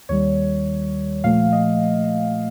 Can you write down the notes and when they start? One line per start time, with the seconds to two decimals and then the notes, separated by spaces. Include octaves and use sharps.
0.09 D#2 D#3 G3 C#5
1.24 A#2 F3 A3 F5
1.52 D#5